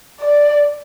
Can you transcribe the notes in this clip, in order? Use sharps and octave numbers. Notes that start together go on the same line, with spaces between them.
D5